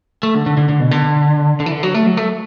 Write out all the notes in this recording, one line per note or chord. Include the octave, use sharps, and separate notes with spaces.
A3
D3
D3
D3
D3
B2
D3
D3
E3
D3
F#3
A3
F#3
A3